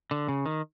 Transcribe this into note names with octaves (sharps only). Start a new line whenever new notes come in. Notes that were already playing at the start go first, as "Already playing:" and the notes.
D3
C#3
D#3